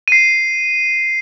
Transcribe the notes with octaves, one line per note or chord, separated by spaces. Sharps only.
C7 D#7